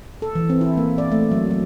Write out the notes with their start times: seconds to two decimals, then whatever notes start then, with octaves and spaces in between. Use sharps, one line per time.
0.22 A4
0.35 E3
0.50 C4
0.61 E4
0.77 A#3
0.98 D5
1.12 A3
1.31 F#3
1.51 F#3